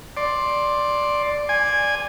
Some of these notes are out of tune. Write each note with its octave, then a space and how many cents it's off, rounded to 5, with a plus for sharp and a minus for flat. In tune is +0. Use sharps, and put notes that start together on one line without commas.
D5 +0 C6 +10
D5 +0 G#5 -15